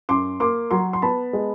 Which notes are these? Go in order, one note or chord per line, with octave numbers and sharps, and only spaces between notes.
F#2 C6 D6
A#3 C6 D6
F#3 A#5 C6
C6
B3 A5 B5
G#3